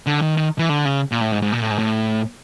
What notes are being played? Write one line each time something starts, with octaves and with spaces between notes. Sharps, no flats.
D3
D#3
D#3
E3
D3
C#3
A#2
A2
G#2
G#2
A#2
A2
G#2
A2